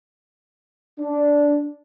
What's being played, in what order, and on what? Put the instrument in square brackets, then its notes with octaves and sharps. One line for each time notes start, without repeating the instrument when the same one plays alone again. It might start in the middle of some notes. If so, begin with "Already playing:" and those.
[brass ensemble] D4